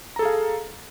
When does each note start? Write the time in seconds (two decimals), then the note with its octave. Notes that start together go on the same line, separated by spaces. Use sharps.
0.16 A#5
0.19 A4
0.22 G#4
0.25 F5